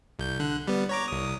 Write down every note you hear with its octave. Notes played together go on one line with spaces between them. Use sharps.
C2 G6
D3 F#6
G3 B3
C#5 A#5 D6
C2 D#6